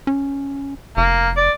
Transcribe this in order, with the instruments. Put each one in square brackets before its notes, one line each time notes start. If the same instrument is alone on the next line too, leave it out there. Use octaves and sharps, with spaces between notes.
[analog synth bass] C#4
[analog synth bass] F1 [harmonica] A#3
[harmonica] D5